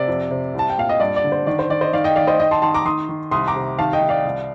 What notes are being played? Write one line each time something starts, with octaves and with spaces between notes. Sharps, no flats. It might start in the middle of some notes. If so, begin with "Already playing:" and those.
Already playing: C3 D5
F2
C3
C2
A5
G5
A#2 F5
D#5
G2 D5
D5
D3
C5
D#3 D5
C5
D#3 D5
C5 D#5
D#3 D5 F5
D#5 G5
D#3 D5 F5
C5 D#5
D#3 D#5 G5
A5 C6
D#3 A5 C6
A#5 D6
D#3 C6 D#6
D#3
C2 C6 D#6
A#5 D6
C3
D#3 F5 A5
D#5 G5
D#3
D5 F5
C2